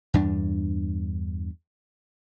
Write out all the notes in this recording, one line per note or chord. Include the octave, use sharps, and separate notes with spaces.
E2 G2 D4